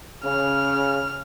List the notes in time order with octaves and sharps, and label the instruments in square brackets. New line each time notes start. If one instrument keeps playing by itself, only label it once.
[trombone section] C#3 [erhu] F6